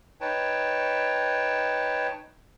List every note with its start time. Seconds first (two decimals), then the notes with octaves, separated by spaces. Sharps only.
0.21 D#4 B4 C#5 G5 A5